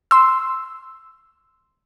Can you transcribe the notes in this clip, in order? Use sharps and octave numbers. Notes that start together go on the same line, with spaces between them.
C6 E6